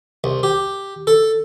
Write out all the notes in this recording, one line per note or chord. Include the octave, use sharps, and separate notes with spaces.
C2
G4
A4